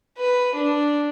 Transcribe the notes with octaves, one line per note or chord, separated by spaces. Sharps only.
B4
D4